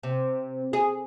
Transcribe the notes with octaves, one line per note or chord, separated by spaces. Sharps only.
C3
G#4